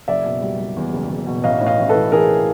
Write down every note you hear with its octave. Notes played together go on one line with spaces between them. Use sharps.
F#1 D5 E5
B2
G3
G3
E2
F#1
E2
B2
A1 D#5 F5
A2
D#5 F5
A1
A4 B4
E3
E3 G#4 A#4